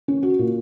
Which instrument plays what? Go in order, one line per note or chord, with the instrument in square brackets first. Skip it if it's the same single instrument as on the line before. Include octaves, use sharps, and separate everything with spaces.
[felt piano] C#4
F#4
A#2